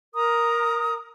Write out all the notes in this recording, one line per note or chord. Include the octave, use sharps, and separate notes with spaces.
A#4 A#5 D#6